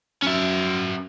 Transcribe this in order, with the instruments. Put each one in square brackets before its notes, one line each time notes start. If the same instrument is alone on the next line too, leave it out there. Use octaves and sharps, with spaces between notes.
[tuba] F#2 [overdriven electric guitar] C#4 E5